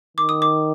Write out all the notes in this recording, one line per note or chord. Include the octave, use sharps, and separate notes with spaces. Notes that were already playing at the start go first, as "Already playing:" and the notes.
D#3 D6
D#6
D6